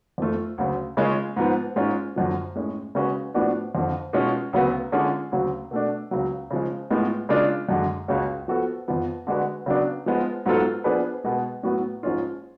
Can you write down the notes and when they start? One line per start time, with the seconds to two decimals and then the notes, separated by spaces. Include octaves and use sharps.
0.18 F2 F3 A3 F4
0.58 D2 C#3 F#3
0.97 C#3 G#3 C#4 F4
1.36 G#2 F3 B3
1.76 G#2 G#3 C#4 F4
2.16 F#2 D3 F3
2.56 A2 G#3 C#4
2.95 C#3 G#3 C#4 F#4 B4
3.34 A2 F3 B3 D4 F#4
3.75 F2 D3 F3
4.13 B2 G#3 C#4 F4
4.53 D2 C#3 F#3 B3
4.92 D3 G#3 C#4 F4 G#4
5.32 D2 C#3 F#3
5.71 B2 A3 D4
6.11 C#2 C#3 F#3
6.51 C#3 F3 G#3
6.90 A2 G#3 B3 F4
7.29 C#3 G#3 D4 F4
7.69 F#2 D3 G#3
8.08 C#2 C#3 G#3 C#4 F#4
8.48 F3 B3 F#4 A4
8.88 F2 F3 B3
9.27 D3 G#3 D4 F#4 B4
9.66 C#3 F#3 B3 D4
10.06 F3 G#3 B3 F4
10.46 G#2 F#3 B3 F4 A4
10.84 F3 B3 D4 G#4 B4
11.24 B2 G#3 B3
11.63 A2 F#3 B3 F#4
12.03 G#2 F3 G#3 C#4 F4